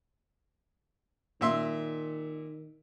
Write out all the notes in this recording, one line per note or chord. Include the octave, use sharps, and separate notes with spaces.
A#2 D#3 E5 C6